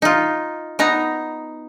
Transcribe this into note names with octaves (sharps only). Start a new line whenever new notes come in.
D#4 F4
B3 D#4 A#5